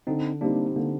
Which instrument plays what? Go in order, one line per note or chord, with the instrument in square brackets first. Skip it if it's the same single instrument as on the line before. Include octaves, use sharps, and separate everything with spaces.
[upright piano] D3 [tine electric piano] C4 D#4
[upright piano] G3 C4 D#4 [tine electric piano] A#3 D4
[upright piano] D3 [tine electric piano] A#3